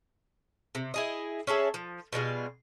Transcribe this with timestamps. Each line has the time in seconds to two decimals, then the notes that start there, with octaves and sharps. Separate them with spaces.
0.75 C3
0.94 E4 G#4 D#5
1.47 C#4 G#4 A4 E5
1.74 F3
2.13 B2 G3 G#3 F4